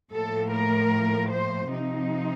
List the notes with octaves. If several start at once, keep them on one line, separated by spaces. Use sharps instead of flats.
A2 F3 A#3 A4
A#4
C5
C3 F3 C4 D#4